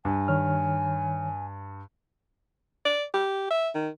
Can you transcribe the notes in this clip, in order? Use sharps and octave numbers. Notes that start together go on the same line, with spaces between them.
G2 G#5
D#3 C#5 F6
D5
G4
E5
D#3